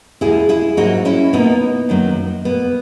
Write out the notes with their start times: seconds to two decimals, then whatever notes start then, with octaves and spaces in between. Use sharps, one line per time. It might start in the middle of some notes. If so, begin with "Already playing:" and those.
0.21 E2 B2 G#3 E4 G#4
0.49 E4 G#4
0.77 G#2 F#3 A#3 D#4 F#4
1.05 C#4 E4
1.33 B2 A#3 B3 D#4
1.89 F#2 D#3 F#3 A#3
2.45 B2 A#3 B3